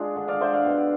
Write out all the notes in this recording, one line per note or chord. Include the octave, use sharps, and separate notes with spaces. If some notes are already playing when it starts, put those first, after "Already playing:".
Already playing: G#3 D4 F4 G#4
D3
D5 F5
D3 C5 E5
D5 F5
B2